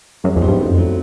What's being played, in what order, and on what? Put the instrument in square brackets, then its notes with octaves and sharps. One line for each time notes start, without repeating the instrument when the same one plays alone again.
[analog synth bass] F#2 [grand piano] G#3
[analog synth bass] F2
[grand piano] B3 D#4 G4 C5
[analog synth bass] G2
[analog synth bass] F#2 [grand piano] D3
[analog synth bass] F2
[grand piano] F#3 A3